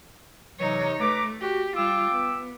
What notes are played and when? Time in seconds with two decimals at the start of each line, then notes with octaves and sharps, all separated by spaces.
0.59 C3 E3 F#3 D#4 C#5
1.00 A3 B4 A#5 D6
1.41 F#4 G4
1.76 G3 F4 G5 D6 E6
2.12 B3